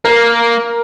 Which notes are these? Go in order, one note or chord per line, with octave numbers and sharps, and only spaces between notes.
A#3 A#4